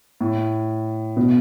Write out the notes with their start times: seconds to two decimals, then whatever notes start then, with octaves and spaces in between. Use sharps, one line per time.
0.21 A2
1.17 B2